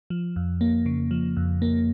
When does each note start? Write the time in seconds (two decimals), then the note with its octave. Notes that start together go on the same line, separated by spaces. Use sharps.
0.10 F3
0.36 F2
0.61 A#3
0.86 C#3
1.11 F3
1.37 F2
1.62 A#3